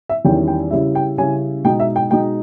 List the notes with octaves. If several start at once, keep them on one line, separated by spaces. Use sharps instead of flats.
E5
E2 D#3 G3 C#4 E4 G5
G5
C#3 G3 C#4 E4 E5
G5
C#3 G3 C#4 E4 G#5
B2 G#3 D#4 G5
E5
G5
B2 G#3 D#4 G5